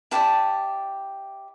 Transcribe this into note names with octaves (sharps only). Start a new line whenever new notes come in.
E4 G4 B4 D5 A5